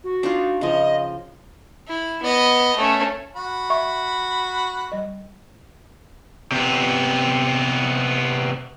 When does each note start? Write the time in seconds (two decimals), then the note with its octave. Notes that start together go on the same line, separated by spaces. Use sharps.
0.04 F#4
0.23 D4 D#4 F4
0.61 C#3 F3 D#5
1.88 E4
2.23 B3 D#5
2.77 A3 C#4
3.36 F#4 B5
3.70 E5 C#6
4.92 G3 D#5
6.52 C3 B3